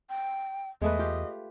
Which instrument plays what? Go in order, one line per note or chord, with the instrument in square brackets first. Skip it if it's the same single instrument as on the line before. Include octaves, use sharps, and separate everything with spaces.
[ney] G5
[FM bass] E2 [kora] G#3 A3 B4 [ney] D#5
[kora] F4 G4